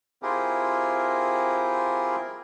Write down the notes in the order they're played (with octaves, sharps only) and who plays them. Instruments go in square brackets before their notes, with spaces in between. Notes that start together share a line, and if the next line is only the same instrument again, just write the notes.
[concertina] C4 E4 F4 G4 G#4 A#4